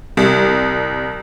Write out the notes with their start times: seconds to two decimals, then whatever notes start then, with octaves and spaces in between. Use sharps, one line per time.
0.17 C2